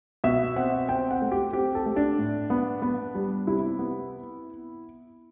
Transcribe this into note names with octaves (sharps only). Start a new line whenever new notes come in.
B2 E5
C4 F#5
C4 G5
F#5
A3
G4
C4 G4
A4
A3
D4
A2
B3
B3
G3
C3 E4
B3